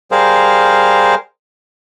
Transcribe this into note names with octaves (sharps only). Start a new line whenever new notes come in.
G3 G#4 A#4 C5 F5